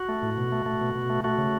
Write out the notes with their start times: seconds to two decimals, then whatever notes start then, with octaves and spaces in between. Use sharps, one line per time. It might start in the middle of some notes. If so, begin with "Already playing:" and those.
Already playing: F#4
0.09 A3
0.22 A2
0.37 B2
0.52 A3
0.66 A3
0.81 B2
0.95 B2
1.10 A3
1.24 A3 F#4
1.38 C#3